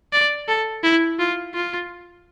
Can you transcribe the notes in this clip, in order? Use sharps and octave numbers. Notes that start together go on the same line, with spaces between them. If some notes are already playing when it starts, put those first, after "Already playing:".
D5
A4
E4
F4
F4